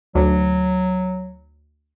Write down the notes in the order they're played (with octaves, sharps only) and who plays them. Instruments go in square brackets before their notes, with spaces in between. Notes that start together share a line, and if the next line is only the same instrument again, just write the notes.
[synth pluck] D2 [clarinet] F#3